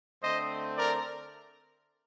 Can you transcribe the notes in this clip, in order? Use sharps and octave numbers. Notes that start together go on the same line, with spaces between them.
D3 A3 C4 C5 D#5
A#4 D5